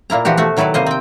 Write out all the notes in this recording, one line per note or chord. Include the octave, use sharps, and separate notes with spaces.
A#2 A#3 E4 A#5
E3 F3 F#4 G4
B2 A3 F#4
D#3 F#3 E4 A4 B4 D5
C3 A#3 C5 D#5
C4 G5